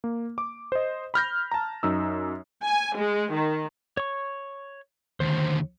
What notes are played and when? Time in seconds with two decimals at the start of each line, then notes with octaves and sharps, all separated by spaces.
0.04 A#3
0.38 D6
0.72 C5 D#5
1.14 B5 F6 G6 A#6
1.51 A5 A#5
1.83 F#2 D#4 E6
2.62 G#5
2.94 G#3
3.31 D#3
3.97 C#5 C#6
5.20 D#2 D3 C5